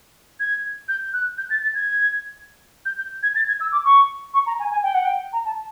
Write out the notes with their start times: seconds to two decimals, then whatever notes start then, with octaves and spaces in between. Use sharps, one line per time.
0.40 G#6
0.89 G6
1.13 F#6
1.38 G6
1.50 A6
1.63 A6
1.75 G#6
2.86 G6
2.98 G6
3.23 G#6
3.35 A6
3.48 G#6
3.61 E6
3.72 D6
3.85 C#6
4.34 C#6
4.46 A#5
4.59 G#5
4.71 G#5
4.83 G5
4.94 F#5
5.05 G5
5.33 A#5
5.45 A5